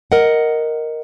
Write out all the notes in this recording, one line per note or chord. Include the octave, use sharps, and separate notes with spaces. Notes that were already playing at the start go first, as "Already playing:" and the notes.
A#4 D#5 F#5